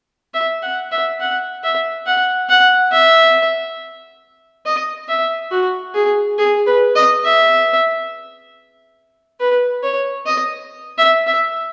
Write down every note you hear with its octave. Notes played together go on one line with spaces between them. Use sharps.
E5
F#5
E5
F#5
E5
F#5
F#5
E5
D#5
E5
F#4
G#4
G#4
B4
D#5
E5
B4
C#5
D#5
E5
E5